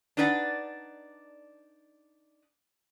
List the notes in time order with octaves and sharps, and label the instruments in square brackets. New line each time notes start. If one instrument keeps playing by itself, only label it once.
[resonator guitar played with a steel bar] D4 D#4 B4 D5 E5 F#5